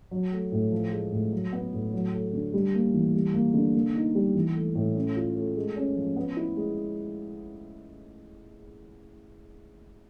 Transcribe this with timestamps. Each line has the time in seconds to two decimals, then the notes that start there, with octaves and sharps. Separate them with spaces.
0.11 F#3
0.32 A3
0.52 A2
0.72 F3
0.92 G#3
1.12 A2
1.32 F#3
1.53 B3
1.72 A2
1.93 F#3
2.13 A3
2.33 D3
2.54 G3
2.74 A#3
2.94 E3
3.14 G3
3.34 A#3
3.54 D3
3.75 A#3
3.95 D#4
4.15 G3
4.35 E3
4.55 A3
4.75 A2
4.95 C#4
5.16 F4
5.36 A3
5.56 G#3
5.76 C#4
5.96 F3
6.16 B3
6.37 E4
6.57 G#3